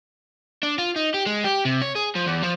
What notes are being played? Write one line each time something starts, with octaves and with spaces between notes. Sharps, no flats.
D4
F4
D#4
G4
G#3
G4
C3
C#5
G#4
F3
E2
F3